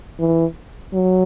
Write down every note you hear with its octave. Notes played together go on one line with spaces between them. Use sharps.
E3
F#3